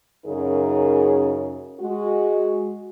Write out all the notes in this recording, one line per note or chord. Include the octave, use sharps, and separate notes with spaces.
F#2 C#3 D#4 G#4 A#4
G#3 F#4